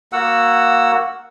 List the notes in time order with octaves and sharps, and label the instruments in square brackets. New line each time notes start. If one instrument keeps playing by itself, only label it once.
[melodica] A#3 F#4 F#5 E6